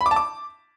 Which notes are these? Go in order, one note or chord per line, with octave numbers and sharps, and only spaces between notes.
B5
D6
A5
D6